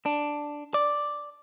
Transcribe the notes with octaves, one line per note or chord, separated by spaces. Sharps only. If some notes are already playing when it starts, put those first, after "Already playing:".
D4
D5